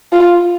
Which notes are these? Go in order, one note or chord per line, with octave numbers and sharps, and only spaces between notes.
F4